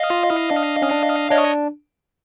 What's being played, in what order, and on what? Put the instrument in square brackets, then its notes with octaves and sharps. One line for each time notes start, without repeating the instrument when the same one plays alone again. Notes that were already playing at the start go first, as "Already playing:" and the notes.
Already playing: [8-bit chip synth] D#5 F5
[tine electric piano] F4
E4
D4
C#4
D4
[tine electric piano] D4 [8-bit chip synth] C#5 D#5